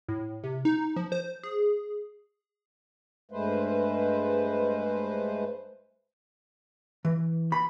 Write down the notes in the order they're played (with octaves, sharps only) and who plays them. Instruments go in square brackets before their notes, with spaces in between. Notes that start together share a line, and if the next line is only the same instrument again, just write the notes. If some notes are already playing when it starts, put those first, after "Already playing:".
[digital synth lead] A2
C3
D#4
F3
C5
G#4
[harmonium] G2 G#3 A3 B4 C5
[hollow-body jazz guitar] E3
B5